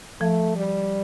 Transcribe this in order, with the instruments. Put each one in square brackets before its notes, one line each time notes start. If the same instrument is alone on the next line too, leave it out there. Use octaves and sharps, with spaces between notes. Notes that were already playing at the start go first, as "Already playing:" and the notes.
[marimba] F3 [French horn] A3
[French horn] G3